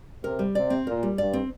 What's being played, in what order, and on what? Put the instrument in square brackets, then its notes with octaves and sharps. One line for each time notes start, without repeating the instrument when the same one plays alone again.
[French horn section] C3 [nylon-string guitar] A#4
[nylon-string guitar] G3
[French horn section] C3 [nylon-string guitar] D5
[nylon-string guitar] C4
[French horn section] A#2 [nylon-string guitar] A#4
[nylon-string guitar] G3
[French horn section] G2 [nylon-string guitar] D5
[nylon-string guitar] C4